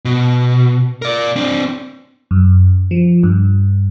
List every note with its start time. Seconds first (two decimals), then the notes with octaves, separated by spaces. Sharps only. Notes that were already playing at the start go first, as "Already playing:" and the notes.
0.05 B2
1.02 A#4 D5
1.36 C4 D4
2.31 F#2
2.91 F3
3.23 G2